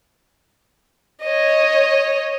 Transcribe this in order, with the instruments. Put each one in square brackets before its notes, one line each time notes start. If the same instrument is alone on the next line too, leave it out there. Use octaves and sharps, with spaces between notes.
[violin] C#5 D#5